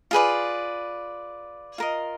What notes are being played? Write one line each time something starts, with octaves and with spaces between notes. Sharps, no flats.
F4 G#4 B4 D5
F4 A#4 D#5